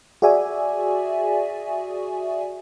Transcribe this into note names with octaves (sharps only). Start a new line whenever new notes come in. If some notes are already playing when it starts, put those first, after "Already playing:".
F#4 G#4 D5 E5 G#5